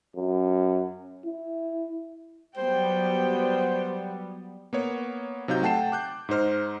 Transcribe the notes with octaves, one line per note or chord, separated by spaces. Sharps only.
F#2
E4
F#3 G3 B3 C5 G5
A#3 B3 C#5
C3 F#3 D#4 F5 G6
A3 F#5 G5 A5 C7 E7
D6 F#6 G6
G#2 D#4 C5 F6